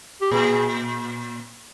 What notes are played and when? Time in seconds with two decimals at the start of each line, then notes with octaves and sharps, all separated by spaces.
0.21 G4
0.31 A#2 G#4